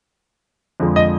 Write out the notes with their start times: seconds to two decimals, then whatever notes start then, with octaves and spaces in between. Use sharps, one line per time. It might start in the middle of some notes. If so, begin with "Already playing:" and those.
0.80 F2 D3 F3 G#3
0.96 D#5